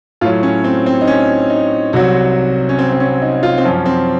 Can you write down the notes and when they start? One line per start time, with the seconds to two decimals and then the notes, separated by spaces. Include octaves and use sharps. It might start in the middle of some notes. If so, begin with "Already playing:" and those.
0.21 A2 F4
0.25 F#3
0.43 C#4
0.64 C4
0.86 C4
1.01 D#4
1.07 C#4
1.50 D#4
1.93 C2 C3 F#3 F#4
2.69 C#4
2.79 C4
2.92 C4
3.00 C#4
3.22 D#4
3.43 F4
3.58 C4
3.64 F#2 F3 C#4
3.86 C4